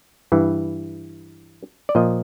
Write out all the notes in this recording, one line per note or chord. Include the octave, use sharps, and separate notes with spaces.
G2 E3
D5
A#2 F3 D#5